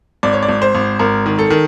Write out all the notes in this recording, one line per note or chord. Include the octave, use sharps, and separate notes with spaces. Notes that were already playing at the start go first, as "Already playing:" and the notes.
G#1 D5
C#5
D5
G#1
C5
G#1
G#1 A#4
D#3
A4
D#3